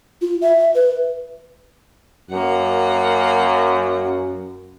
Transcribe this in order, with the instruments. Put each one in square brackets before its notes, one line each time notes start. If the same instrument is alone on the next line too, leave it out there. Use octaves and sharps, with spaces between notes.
[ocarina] F4
E5
B4
[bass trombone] F#2 [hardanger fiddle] A#3 F#5